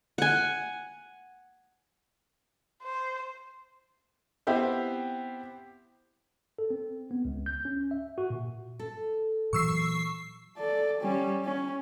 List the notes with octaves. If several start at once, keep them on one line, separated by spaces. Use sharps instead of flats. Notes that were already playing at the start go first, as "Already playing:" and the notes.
F#5 G#5
C5
B3 C4 E4 G4 C5
A4
C4
B3
C#2
G6
C#4
E5
F#4
A#2
A4
A#2 E3 F#3 C#6 E6 C7
A4 D5
G3 C#4
C#4